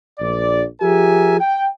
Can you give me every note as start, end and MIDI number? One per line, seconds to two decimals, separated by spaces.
0.20 0.64 34
0.20 0.64 74
0.81 1.37 53
0.81 1.37 67
0.81 1.37 68
0.81 1.37 70
0.81 1.37 76
0.81 1.37 80
1.40 1.66 79